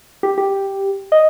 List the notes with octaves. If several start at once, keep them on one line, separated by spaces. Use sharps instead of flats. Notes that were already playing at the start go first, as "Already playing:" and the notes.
G4
G4
D#5